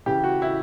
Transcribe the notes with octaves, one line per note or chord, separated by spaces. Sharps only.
C#3 E3 G4
F#4
E4